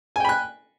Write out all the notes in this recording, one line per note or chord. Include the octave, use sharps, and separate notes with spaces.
G5 G#5 B5 F#6